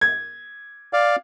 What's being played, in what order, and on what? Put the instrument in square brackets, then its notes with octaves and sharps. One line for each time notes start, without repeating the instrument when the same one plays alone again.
[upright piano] G#6
[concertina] D5 F5